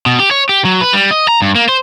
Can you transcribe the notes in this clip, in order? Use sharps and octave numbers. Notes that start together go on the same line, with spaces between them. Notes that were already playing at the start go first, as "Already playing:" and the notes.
B2
G4
C#5
G4
F#3
B4
G3
D#5
A#5
G2
A#3
C5